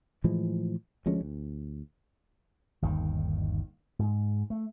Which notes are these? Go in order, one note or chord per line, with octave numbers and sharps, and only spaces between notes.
A2 E3 F3 G#3
D2 F3 G#3 C#4
D2
G1 D#2 D#3
G#2
A3